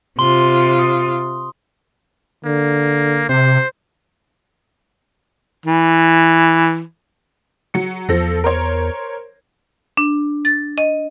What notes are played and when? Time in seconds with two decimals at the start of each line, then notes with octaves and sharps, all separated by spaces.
0.19 C3 F4 C6 G7
0.79 D#6
2.45 D3 A#3
3.29 C3 C5
5.66 E3
7.74 F#3 C#7
8.09 E2 F3 A4 A#6
8.44 A#4 C5 C#5
9.97 D4
10.45 A6
10.78 D#5